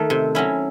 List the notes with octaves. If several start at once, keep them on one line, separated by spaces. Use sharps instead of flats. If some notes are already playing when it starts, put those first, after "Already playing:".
Already playing: D#3 A3
C3
F#3 C#4 E4